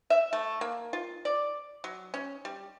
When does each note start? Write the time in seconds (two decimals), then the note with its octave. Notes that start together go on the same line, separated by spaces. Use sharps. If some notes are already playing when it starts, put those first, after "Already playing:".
0.10 E5
0.33 A3
0.61 A#3
0.93 F4
1.25 D5
1.84 F#3
2.14 C#4
2.45 G3